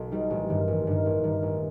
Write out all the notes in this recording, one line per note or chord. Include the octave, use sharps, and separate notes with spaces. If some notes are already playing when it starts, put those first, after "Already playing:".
Already playing: B1
B2 G3 D#4
A1
G2 D#3
A1
G2 D#3
A1
G2 D#3
A1